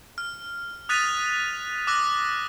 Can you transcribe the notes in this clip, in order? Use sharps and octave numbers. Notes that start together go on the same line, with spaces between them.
F6
D#6 F#6 A6 B6 D#7 F7
D6 E6 F#6 A#6